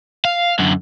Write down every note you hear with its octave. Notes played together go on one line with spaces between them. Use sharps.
F5
F#2 D3